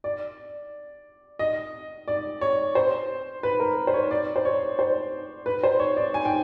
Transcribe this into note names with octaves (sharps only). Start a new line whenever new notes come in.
D5
D#5
D5
C#5
C5
B4
A#4
C5
C#5
D5
C5
C#5
C5
B4
C5
C#5
D5
G#5
G5